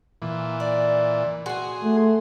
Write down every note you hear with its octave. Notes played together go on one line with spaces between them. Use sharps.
A#2 E3
D5
F#4 G#4 G#5 C6
A3